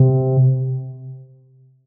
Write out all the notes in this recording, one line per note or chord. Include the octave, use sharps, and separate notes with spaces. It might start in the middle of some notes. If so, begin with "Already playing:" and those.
Already playing: C3